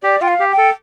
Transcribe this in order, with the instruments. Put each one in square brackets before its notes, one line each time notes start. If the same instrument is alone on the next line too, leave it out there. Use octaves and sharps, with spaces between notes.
[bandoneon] G4 [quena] D5
[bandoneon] F4 [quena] G5
[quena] F5
[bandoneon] G4
[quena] G5
[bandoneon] A4